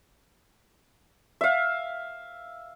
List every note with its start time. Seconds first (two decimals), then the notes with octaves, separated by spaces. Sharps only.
1.41 E5 F5